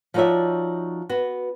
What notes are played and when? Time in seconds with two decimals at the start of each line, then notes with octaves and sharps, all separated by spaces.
0.14 F3 D#4 F#4 C#5 D5 E5
1.09 B3 F#4